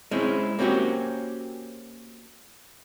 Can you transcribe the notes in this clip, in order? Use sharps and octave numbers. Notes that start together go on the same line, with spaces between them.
G#3 C4 C#4 E4
A#3 C4 C#4 F#4 G4